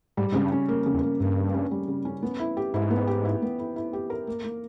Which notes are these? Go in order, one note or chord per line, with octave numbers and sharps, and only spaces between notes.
G#2 G3
G#2 C#3
G2
C#4
A#3
C#3
E2
A#3
G2 A#3
C#3
C#4
G3
C#3
C#4
B3
E4
G4
G#2 E4
B3
G4
E4
B3
E4
E4
G4
A#4
A#3
A#3